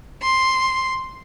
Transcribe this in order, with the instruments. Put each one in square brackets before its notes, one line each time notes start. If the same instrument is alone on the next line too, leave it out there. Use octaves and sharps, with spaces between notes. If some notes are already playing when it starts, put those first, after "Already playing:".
[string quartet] C6